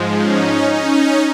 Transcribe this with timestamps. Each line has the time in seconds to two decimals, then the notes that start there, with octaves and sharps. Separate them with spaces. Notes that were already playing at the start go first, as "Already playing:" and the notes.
Already playing: G#2 F3 G#3
0.17 C#4 D#4
0.71 C#4 D#4